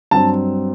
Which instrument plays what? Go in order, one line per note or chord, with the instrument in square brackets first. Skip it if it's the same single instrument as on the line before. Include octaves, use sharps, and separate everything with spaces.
[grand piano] G2 F#3 C4 A5